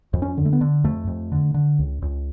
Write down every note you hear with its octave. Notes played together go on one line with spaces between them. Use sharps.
F2
C#4
D3
A3
B3
D3
F2 A3
F2
D3
D3
C#2
C#2